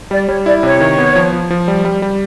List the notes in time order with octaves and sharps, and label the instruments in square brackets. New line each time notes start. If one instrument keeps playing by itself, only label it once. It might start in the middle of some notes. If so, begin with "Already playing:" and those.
[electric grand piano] G3 [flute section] D5
[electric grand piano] G3 [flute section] C#5
[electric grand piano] E4 [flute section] D5
[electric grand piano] C3 [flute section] C#5
[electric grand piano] D#3
B3
F3
F3
F3
G3
G3
G3